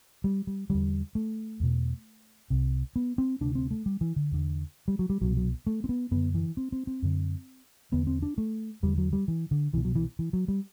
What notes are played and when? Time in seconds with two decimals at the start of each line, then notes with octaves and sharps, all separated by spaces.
0.24 G3
0.47 G3
0.69 E2 D3 G3
1.15 A3
1.60 E2 B2
2.50 C2 C3
2.96 B3
3.18 C4
3.41 D2 C3 D4
3.55 C4
3.71 A3
3.86 G3
4.01 E3
4.16 D3
4.32 E2 D3
4.88 G3
4.99 F#3
5.10 G3
5.21 C2 B2 F#3
5.37 F#3
5.67 A3
5.84 C4
5.89 B3
6.11 F#2 D3 B3
6.34 E3
6.57 C4
6.72 C4
6.87 C4
7.02 F#2 D3
7.92 E2 D3 B3
8.07 C4
8.23 D4
8.38 A3
8.83 E2 D3 G3
8.98 F#3
9.13 G3
9.28 E3
9.51 D3
9.73 C2 E3
9.77 B2
9.85 F#3
9.95 E3
10.19 E3
10.33 F#3
10.48 G3